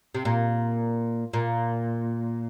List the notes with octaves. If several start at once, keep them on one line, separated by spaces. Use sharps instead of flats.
C3
A#2
A#2